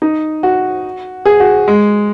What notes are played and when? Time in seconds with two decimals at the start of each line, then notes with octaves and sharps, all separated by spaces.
0.02 D#4
0.43 F#4
1.25 G#4
1.40 F#4
1.68 G#3